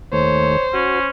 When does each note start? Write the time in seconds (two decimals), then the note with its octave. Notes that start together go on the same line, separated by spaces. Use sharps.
0.13 D#2 A3 C5 C#5
0.73 C#4 F#4